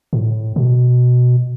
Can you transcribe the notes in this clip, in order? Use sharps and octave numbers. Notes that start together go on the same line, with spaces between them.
A2
B2